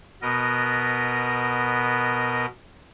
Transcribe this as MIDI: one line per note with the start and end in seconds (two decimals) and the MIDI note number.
0.22 2.46 47
0.22 2.46 59
0.22 2.46 70
0.22 2.46 75